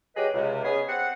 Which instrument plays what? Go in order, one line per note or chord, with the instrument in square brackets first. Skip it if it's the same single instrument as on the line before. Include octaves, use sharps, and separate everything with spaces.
[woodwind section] F#3 G4 G#4 B4 D#5
C#2 C3
B3 C#4 D#4 G#4
C4 F#5